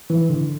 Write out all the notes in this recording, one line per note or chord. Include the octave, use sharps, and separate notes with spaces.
E3
D3